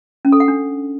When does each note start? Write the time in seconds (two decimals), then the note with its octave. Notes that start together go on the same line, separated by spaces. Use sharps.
0.25 C#4
0.32 A4
0.40 F#5
0.48 D4